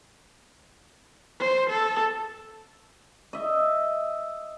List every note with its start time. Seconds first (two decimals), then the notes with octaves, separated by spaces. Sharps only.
1.40 C5
1.70 A4
3.33 D#5 E5